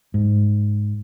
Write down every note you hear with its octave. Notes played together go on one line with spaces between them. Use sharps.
G#2